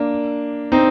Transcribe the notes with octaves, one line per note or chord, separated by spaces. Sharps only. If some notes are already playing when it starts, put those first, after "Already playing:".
Already playing: A#3 D4
C4 D#4